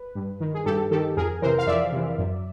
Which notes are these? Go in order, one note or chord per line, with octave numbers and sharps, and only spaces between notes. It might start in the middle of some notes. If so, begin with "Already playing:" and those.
Already playing: B4
G2
D#3
G#4
G2 G4 A4
D#3 G4 A4
F2 G#4 A#4
C3 E3 A#4 C5
F5
F2 D5 E5
C3 E3
F#2